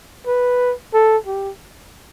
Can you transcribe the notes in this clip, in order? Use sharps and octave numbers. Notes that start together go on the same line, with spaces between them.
B4
A4
G4